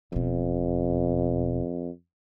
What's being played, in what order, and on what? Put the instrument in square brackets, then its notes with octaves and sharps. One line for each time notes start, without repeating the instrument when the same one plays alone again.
[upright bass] E1 B2 [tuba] F2